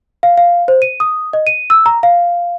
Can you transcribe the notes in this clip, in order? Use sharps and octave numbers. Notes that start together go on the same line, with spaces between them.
F5
F5
C5
D#7
D#6
D#5
D#7
E6
A#5
F5